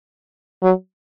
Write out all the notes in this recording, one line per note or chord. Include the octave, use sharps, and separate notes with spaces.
F#3